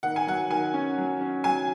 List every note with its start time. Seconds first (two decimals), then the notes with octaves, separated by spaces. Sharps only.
0.03 D#3 F#5
0.16 G#5
0.27 F#3 F#5
0.50 D#3 G#5
0.74 C#4
0.98 F#3
1.21 C#4
1.44 F#3 G#5